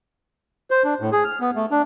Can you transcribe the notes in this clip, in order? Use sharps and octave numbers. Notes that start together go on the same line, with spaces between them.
C5
D4
A2
G#4
F6
B3
A3
D4